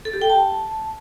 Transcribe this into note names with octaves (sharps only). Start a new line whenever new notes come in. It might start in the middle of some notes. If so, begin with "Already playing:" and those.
A4
G4
G5
A5